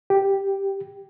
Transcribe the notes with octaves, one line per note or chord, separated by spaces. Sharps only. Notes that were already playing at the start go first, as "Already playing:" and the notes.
G4